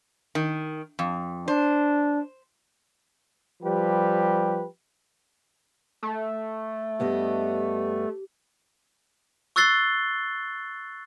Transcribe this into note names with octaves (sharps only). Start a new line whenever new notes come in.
D#3
F2
D4 C5
F3 G3 G4 B4
A3
G2 B3 G4 D#5
C#6 E6 F#6 A6 C7 G7